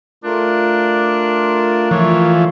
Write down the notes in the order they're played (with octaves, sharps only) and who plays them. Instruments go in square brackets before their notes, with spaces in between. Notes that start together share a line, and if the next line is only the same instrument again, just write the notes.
[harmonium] A3 F4 A#4 [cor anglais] D4
[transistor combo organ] E3 F3 [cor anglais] C#5